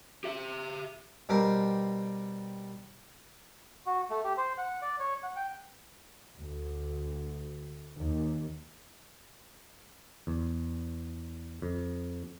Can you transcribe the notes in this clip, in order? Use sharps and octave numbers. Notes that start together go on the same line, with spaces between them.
G4 E5
B2 G3 C4 G4 A#4
F#4
A3
G4
C5
F#5
D5
C#5
F#5
G5
D2
D#2
E2
F2